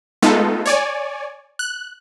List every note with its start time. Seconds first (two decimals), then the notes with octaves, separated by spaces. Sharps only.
0.22 G#3 A3 B3 D#4 F4 A4
0.66 C#5 D5 G#5
1.59 F#6